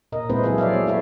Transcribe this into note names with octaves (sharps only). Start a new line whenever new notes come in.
A#2 A#4 D#5
G#3 B3 C4 E4 B4 C5
F3 F#3 E4 F4 G#4 A4
C#5 D5 E5 F5
B3
A3 B3 E4 A4 C#5 E5